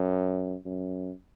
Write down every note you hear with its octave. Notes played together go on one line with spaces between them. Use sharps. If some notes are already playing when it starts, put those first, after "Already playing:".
Already playing: F#2
F#2